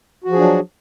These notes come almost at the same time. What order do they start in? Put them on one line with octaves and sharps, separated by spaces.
F#4 F3 G#4 D4 F#3